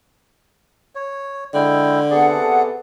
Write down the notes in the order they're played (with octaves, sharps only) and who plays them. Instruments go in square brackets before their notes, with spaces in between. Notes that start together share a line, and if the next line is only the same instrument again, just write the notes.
[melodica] C#5
[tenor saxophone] D3 [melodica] G#3 E4 G5
[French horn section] C3 B3 A4 [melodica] G#4 D5 [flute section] F#5